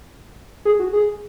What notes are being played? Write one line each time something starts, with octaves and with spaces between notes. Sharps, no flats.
G#4
F#4
G#4